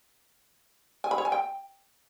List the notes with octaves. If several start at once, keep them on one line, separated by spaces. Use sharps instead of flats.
G#5
B5
C#5
G#5
G5